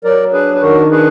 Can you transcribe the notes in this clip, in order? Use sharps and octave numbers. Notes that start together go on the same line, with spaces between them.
F#3 A#4 D5
D4 G#4 B4
B4
D#3 F#4 A#4
D4 G#4 B4